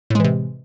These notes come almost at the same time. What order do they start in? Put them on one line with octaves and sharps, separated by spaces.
A2 G#3 E3 C3